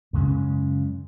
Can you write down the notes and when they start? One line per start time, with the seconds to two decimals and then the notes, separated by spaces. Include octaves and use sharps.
0.13 F#2 C#3 G#3 C#4